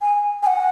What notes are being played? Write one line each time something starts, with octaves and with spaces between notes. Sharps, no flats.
G#5
G#5
F#5